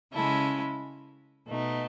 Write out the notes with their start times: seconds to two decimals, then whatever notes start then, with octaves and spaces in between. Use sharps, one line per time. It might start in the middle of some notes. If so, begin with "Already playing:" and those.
0.13 C#3 G#3 C#4 E4 A4
1.47 B2 A3 D#4